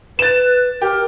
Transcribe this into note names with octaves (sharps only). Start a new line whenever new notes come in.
B4 A6 E7
G4 A#4